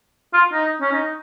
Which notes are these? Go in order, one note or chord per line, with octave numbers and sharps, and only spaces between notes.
F4
D#4
C#4
D#4